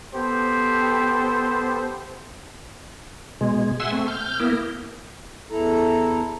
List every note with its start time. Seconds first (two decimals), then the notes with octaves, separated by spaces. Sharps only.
0.14 B3 G4 A4 C5
3.41 B2 G#3
3.80 E5 F#5 G#5 C6 E6
3.92 A3 C4
4.08 F6 G6
4.40 A#3 B3 E4 A#4
5.50 E2 E4 A4 A#5